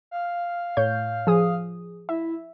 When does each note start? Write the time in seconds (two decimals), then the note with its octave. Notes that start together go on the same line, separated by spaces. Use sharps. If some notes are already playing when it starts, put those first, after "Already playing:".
0.11 F5
0.77 A2 C#5 G6
1.27 F3 G#4 D#6
2.09 E4 E5